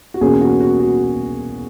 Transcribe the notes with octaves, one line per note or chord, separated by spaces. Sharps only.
F#4
E2 B2 A#3 C#4 G#4
F#4
F#4
F#4